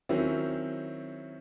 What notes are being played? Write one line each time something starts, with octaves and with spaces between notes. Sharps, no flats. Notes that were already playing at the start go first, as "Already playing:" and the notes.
D#3 F#3 C4 C#4 E4